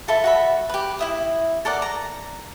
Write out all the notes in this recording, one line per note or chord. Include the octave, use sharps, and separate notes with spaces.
F4 A4 E5 B5
F#4 E5 B5
G4 B4
E4 E5 D#6
A4 A#4 D5 F#5
A#5